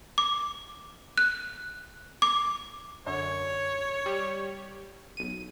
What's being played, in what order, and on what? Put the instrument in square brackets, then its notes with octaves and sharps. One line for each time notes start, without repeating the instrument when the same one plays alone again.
[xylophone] D6
F#6
D6
[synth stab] F#2 D3 [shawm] C#5
[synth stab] G3
B1 D#7